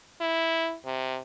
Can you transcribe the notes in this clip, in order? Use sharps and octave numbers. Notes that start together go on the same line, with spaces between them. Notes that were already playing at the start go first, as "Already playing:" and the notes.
E4
C3